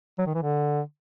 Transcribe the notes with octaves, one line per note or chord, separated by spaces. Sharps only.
F#3
D#3
E3
D3